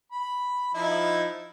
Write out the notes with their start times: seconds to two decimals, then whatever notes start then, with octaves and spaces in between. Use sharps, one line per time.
0.12 B5
0.75 F3 D#4 E4